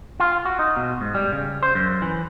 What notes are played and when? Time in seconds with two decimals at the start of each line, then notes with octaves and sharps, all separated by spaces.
0.20 F4
0.45 F#4
0.59 D#4
0.77 B2
1.01 G#2
1.15 G3
1.32 C#3
1.63 C5
1.75 F#2
2.02 E3